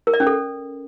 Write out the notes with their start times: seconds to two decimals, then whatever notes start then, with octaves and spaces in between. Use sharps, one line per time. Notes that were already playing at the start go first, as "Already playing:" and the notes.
0.07 A#4
0.14 D5
0.20 C#4
0.27 A4